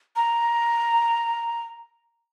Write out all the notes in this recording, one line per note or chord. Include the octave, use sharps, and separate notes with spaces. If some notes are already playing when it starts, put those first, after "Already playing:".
A#5